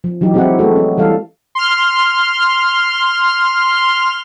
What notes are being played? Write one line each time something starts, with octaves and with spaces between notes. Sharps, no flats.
F3
E3 F#3 D#4 G4
G#3 C4 E4 F#4 G4 F#5
G#3 A3 B3 F#4 A4
C#4
E3 G3 A4 F5
C6 F6